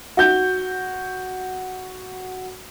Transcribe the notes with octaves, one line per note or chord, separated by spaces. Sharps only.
F#4 G6